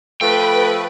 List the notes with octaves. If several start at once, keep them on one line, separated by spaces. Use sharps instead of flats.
F3 A3 B4 G5